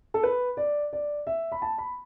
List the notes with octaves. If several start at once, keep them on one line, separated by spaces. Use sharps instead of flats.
A4
B4
D5
D5
E5
B5
A5
B5